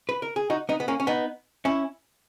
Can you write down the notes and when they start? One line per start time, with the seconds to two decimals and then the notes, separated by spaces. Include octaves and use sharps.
0.09 B4
0.22 A#4
0.36 G#4
0.50 D#4 F#4
0.69 B3 D#4
0.80 B3
0.88 A#3 C#4
1.00 C#4
1.07 B3 D#4
1.65 C#4 E4